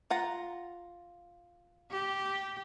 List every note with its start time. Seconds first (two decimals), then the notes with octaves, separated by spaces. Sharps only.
0.10 F4 F#5 A#5
1.91 G4